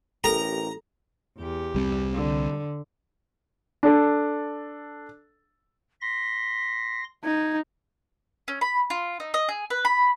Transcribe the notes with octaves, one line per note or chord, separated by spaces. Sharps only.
A1 G4 A4 A#4 A#5
E2 G4
C2 G3 C4
D3
D4 A4
C6 A#6 B6
D#4 G#6
C#4
B5
F4
D#4
D#5
G#4
B4
B5